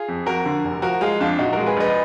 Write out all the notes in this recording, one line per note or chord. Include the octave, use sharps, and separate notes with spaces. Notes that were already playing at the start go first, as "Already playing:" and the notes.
Already playing: F4 G#4
F2
F2 F#4 A#4
D3
F1
F3 F#4 A#4
G#3 F4 G#4
F2 D4 F4
A#2 D#4 F#4
G#3 F#4 A#4
G#4 B4
A#1 B4 D#5